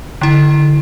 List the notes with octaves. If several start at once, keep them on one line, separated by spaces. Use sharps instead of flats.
D3 E4